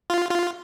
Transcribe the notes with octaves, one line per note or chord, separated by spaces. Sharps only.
F4
F4